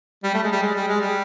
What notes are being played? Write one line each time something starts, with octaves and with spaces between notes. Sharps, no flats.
G3
A3
G#3
G3
G#3
G3
G#3
G3